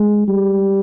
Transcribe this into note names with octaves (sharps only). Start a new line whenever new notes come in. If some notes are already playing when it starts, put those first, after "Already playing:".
Already playing: G#3
G3